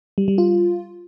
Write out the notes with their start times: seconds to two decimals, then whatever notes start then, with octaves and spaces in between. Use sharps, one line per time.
0.18 G3
0.28 G3
0.38 F4